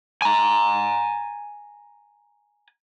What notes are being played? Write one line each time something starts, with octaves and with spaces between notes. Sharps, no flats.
G#5 A#5